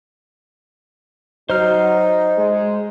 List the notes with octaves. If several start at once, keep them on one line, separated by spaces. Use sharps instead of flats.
F#3 D#4 C5 F6
G#3